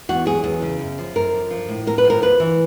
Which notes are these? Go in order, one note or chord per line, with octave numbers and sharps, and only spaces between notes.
E2 F#4
F#3 G#4
E2 G#4
C#3
F#2
F3
F#2 A#4
D3
F3
A2
A2 A#4
B4
F3 A#4
D2 B4
E3